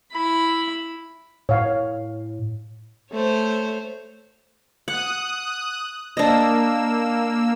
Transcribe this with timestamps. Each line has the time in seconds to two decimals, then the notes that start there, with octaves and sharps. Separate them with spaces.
0.12 E4 B5
1.49 A2 C#5 F5
3.12 A3 C5 C#5
4.88 F#5 D#6 F#6
6.17 A#3 D4 D#5 E6